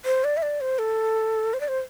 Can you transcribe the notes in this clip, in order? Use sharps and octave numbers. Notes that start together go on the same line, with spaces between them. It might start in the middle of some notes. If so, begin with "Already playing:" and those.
C5
D5
E5
D5
C5
A4
C5
D5
C5